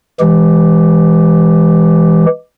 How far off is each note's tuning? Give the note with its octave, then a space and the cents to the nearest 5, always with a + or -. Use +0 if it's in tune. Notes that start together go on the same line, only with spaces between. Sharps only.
E3 +0 G#3 +0 G4 -5